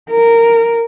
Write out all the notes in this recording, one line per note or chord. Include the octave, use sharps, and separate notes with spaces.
A#4